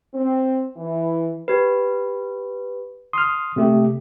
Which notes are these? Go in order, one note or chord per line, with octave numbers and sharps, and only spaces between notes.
C4
E3
G4 B4
C6 D#6 F6
C3 A3 G4